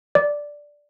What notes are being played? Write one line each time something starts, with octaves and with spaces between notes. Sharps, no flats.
D5